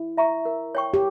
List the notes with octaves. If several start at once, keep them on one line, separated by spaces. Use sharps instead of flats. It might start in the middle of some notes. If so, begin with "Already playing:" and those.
Already playing: E4
E5 A#5 C#6
A#4
C#5 G5 C#6
G4